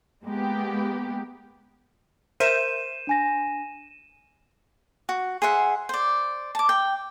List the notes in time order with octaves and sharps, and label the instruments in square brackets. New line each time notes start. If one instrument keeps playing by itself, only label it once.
[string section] G#3 A#3 B3 G4
[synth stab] A#4 E5 G6 [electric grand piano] C5 [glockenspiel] D#7 E7
[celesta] D4 G#5 A#6
[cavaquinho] F#4
G#4 C5 E5 F#5
C5 D5
A5 D6
G5